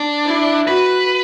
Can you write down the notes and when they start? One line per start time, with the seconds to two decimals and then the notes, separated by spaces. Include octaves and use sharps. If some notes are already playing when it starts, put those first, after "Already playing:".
Already playing: D4
0.26 E4
0.67 F#4 B4